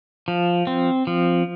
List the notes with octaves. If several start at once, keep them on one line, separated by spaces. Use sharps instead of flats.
F3
C4
F3